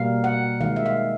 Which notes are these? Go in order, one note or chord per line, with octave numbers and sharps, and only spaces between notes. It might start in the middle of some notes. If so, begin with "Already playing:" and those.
Already playing: B2 G3 A#3 F5
F#5
D#3 G#3 F5
E5
F5